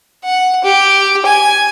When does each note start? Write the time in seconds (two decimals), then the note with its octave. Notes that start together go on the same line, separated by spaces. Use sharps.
0.24 F#5
0.64 G4
1.26 G#5